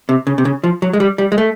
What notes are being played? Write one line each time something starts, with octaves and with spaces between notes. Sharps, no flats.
C3
C#3
C3
C#3
F3
F#3
G#3
G3
G3
G#3
A3